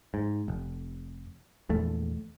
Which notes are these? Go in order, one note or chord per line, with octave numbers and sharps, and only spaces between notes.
G#2
F1
A#1 E2 A3